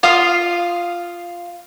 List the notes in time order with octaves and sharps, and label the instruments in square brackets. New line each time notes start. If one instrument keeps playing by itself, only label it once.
[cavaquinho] F4 F5 D#6